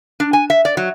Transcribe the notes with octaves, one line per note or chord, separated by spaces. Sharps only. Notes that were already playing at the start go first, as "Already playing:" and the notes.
D4
G#5
E5
D5
F#3